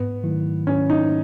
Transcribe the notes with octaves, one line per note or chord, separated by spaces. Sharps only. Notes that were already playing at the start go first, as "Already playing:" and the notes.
Already playing: G#2 B3
D#3 F#3 A3 E4
G#2 C#4
D#4